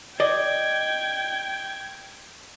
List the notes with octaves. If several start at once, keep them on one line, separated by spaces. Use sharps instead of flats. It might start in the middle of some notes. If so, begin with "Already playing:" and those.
D5 D#5 G5 G#6